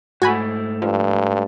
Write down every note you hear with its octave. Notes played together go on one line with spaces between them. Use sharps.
G#2 A3 F#4 G#5 B5
G2 F3